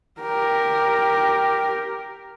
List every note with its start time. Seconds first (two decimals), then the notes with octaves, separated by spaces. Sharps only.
0.21 G4 A#4